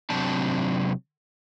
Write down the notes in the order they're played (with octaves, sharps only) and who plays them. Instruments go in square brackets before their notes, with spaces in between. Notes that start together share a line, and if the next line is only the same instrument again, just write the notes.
[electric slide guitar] C3 F#3 C4 D4 A5